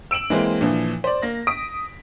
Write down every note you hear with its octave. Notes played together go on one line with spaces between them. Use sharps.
E6 D7 E7 F#7
E3 G#3 A#3 C4
A#2 D3 E3 F3
C5 D5
A#3 A#6
D#6 B6 D7